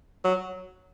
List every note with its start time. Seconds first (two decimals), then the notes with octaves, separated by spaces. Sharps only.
0.24 F#3